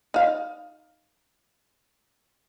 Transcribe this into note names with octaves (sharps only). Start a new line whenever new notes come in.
D#4 F5